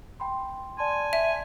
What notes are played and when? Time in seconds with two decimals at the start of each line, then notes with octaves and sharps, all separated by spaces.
0.20 G5 B5 C6
0.78 D5 G#5 A5 C6
1.13 E5